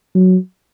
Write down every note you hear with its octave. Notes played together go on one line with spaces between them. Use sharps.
F#3